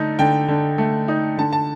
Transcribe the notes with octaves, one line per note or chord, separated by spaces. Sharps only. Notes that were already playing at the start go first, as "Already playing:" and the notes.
Already playing: D3 A3 D#4
D3 G5
D3
A3
D#4
D3 A5
A5